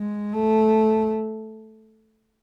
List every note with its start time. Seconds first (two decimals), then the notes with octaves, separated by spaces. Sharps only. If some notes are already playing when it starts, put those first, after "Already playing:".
Already playing: G#3
0.33 A3